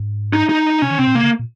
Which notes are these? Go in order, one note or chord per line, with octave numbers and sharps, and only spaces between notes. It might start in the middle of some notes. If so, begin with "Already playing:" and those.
Already playing: G#2
D#4
D#4
C3 C#4
D#3
C3 C4
A#2
C3 A#3
C#3
A#2